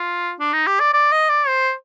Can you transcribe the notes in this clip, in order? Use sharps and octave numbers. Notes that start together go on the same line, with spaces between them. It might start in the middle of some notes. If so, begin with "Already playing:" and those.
Already playing: F4
D4
D#4
G4
D5
D5
D#5
D5
C5